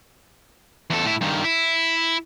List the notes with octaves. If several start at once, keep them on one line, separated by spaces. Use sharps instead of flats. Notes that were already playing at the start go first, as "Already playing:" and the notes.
E2 A4
A2 E4
G2 D#3
E4